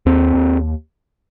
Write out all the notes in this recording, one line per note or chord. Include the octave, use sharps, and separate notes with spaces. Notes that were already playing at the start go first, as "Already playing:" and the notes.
D#2 C4
D#2